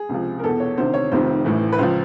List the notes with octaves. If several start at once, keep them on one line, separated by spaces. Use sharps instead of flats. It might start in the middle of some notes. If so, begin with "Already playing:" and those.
Already playing: G#4
C#2 C3 F3
A#4
E2 B2 A4
C#5
D2 C3 D#3 C5
C#5
F1 F2 C3 D#3 C5
A1 A2 E3
B4
C#2 C#3 F3 C5